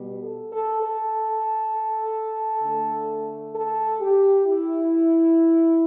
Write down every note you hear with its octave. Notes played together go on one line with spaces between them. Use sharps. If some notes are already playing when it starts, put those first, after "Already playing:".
Already playing: B2 G3 B3
A4
A4
A4
D3 A3
A4
G4
E4